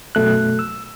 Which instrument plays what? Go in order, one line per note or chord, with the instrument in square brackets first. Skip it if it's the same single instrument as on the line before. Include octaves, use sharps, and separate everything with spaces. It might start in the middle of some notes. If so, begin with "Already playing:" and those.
[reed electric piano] F#2 B2 A3 F#6
E6